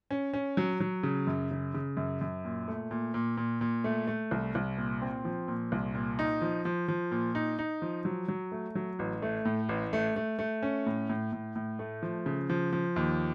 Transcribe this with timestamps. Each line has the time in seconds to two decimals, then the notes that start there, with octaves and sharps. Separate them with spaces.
0.11 C#4
0.33 C#4
0.57 F#3
0.80 F#3
1.03 C#3
1.27 F#2
1.51 C#3
1.74 C#3
1.97 F#2
2.21 F#2
2.45 A#2
2.68 A3
2.91 A#2
3.14 A#2
3.37 A#2
3.61 A#2
3.84 A3
4.07 A3
4.31 C2
4.55 C2
4.77 A#2
5.02 C4
5.25 F3
5.48 A#2
5.72 C2
5.94 A#2
6.19 D#4
6.42 F3
6.65 F3
6.88 F3
7.11 A#2
7.35 D#4
7.59 D#4
7.82 F3
8.05 F#3
8.28 F#3
8.52 A3
8.75 F#3
8.99 A1
9.22 A3
9.45 A2
9.69 A1
9.93 A3
10.16 A3
10.39 A3
10.63 C#4
10.86 A2
11.09 A2
11.32 A2
11.55 A2
11.79 A3
12.02 F3
12.26 C#3
12.50 F3
12.73 F3
12.96 D#2